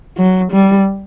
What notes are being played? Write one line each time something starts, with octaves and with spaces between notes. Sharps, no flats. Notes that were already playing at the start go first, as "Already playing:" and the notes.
F#3
G3